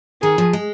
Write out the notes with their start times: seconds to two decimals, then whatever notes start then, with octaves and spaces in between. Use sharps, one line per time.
0.22 D#3 G#4
0.38 F3
0.53 G#3